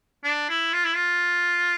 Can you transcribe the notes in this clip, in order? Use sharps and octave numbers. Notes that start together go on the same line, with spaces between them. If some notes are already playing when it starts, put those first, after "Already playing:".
D4
E4
F4
E4
F4